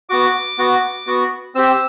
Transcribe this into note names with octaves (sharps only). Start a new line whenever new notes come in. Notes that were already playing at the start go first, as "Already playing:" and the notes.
B3 F#4 D6
B3 F#4
B3 F#4
C4 G4 E6